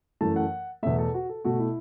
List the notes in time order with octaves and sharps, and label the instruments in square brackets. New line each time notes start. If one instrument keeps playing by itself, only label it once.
[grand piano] F#2 E3 A3 A5
F#5
E2 B2 A3 E5
A4
F#4
A4
B2 A3 F#4
E4